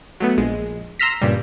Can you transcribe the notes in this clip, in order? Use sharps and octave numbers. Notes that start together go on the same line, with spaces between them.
F#3 A3 B3
A#1 G#3
A#5 C6 E6 F6 A#6 B6
G2 A#2 C#3 G3